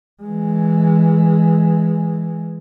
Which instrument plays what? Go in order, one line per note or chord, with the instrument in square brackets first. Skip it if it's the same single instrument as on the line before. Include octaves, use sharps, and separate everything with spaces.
[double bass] E3 G#3